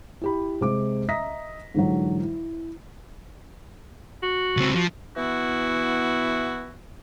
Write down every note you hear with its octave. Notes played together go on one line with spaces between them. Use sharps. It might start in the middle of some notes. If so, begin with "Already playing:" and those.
E4 G4 B5
C3 G#3 D6
D#5 E5 A#5 D#6 A#6 B6
G#2 D3 E3 F#3
E4
F#4
C#2 C4
F3 F#4
E3 B3 E4 F#4